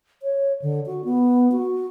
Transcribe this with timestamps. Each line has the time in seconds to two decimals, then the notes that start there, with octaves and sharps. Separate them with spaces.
0.22 C#5
0.62 D3
0.86 F#4
1.05 B3
1.52 F#4